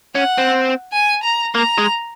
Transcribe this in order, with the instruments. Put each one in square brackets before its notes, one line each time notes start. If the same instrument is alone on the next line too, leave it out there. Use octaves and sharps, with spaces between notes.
[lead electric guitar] C#4 [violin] F#5
[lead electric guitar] C4
[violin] G#5
A#5
[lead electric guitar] A#3 [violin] A#5
[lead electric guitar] G#3